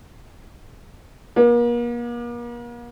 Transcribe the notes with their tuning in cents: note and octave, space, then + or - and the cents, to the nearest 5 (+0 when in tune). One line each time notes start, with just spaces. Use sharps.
A#3 +40